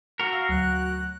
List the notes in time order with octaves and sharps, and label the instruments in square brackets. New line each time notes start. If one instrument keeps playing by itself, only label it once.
[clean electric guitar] F#4 A#4
[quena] F5 [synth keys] E6 F6 A#6
[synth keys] D2 F#3 [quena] F#6